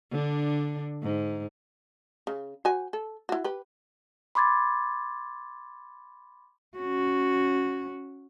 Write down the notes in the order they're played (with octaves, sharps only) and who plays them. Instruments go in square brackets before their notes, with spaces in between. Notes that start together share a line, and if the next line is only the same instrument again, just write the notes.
[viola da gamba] D3 D4
G#2
[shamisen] C#3
F#4 C5 G#5
A4
E4 F#4
G4 B4
[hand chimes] B5 C6 D6 G#6 A6
[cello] C#4 F#4